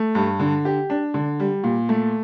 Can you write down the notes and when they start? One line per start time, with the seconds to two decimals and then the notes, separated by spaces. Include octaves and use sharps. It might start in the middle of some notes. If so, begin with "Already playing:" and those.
Already playing: A3
0.15 G2
0.40 D3
0.65 G4
0.90 D4
1.14 D3
1.40 G3
1.64 A#2
1.89 A3